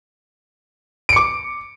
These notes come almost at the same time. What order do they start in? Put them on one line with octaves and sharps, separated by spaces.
D7 C#7 D6